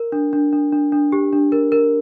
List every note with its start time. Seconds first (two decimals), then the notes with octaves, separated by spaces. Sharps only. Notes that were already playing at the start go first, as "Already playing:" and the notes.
Already playing: A#4
0.12 D4
0.33 D4
0.53 D4
0.72 D4
0.92 D4
1.12 G4
1.33 D4
1.52 A#4
1.72 A#4